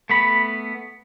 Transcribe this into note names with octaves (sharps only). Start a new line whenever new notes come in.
A3 B3 B5